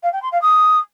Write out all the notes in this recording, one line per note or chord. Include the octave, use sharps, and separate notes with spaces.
F5
G5
C6
F5
D#6